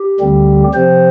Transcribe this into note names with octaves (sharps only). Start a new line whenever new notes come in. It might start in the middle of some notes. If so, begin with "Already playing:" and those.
Already playing: G4
D2 D3 G3 C4
C3 F3 C4 C5